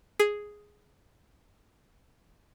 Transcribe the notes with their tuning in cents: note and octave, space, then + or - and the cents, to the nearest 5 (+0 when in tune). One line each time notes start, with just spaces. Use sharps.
G#4 +0